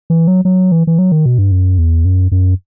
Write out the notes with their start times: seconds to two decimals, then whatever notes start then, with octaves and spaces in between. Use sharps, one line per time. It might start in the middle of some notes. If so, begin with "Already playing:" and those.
0.10 E3
0.28 F#3
0.45 F#3
0.72 E3
0.87 E3
0.99 F#3
1.12 D#3
1.26 B2
1.38 G2
1.52 F#2
1.78 E2
2.05 F#2
2.32 F#2